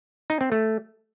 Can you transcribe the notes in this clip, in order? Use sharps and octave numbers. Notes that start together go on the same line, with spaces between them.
D#4
C4
A3